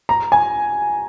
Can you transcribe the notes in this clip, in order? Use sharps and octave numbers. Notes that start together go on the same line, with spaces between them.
A#5
G#5